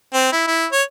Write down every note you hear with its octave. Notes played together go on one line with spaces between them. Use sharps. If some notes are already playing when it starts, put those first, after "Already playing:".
C4
E4
E4
C#5